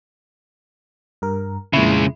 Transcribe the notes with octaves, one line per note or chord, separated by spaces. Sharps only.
G2 A#4
F2 A#2 C#3 G#3 E4